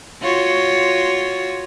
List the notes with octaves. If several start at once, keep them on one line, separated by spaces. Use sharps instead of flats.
F4 F#4 C#5